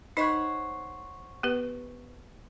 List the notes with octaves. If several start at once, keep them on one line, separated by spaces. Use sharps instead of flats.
D#4 C5 C#5 D#5 F#5
B3 G4 B4